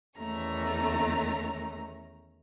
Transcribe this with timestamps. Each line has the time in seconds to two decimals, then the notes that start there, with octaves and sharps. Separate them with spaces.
0.18 E2 D#3 A3 C#4 A#5